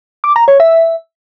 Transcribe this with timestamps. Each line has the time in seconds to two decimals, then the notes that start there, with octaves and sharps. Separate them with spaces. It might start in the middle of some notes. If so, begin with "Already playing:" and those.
0.24 D6
0.36 A#5
0.48 C#5
0.60 E5